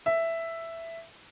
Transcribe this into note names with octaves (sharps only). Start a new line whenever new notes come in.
E5